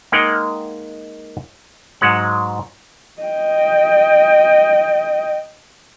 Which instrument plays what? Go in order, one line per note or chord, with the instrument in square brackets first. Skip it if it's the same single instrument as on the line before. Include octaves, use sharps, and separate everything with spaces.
[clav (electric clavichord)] G#3 A#3 D#4 F#5 G5
G#2 F#3 G#3 F#5
[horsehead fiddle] D#5 G5